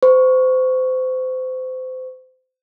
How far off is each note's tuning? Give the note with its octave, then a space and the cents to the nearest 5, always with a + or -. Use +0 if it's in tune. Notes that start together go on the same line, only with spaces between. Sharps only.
C5 -30 C#6 +0